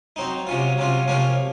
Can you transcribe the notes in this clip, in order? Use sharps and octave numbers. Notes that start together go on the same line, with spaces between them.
F#3 C4 D#4
C3 F#3 C#4 F4
C3 F#3 C#4 F4
C3 F3 A#3 C#4 F4